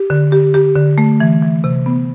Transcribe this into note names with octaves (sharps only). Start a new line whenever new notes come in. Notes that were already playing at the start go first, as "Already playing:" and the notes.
Already playing: G4
D3
G4
G4
D3
A3
E3
E3
C3
B3